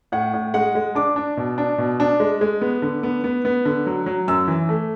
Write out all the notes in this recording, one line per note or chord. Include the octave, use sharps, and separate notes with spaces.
A2 F#5
A2
G#3 F#5
G#3
D4 D6
D4
B2
D4
B2
D4
G#3
G#3
B3
D3
B3
B3
B3
D3
F#3
F#3
F#2 E6
E3
A3